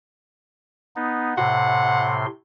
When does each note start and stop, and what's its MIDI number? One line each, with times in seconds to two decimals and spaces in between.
0.96 1.34 59
0.96 1.34 63
1.37 2.26 45
1.37 2.26 48
1.37 2.19 78
1.37 2.26 84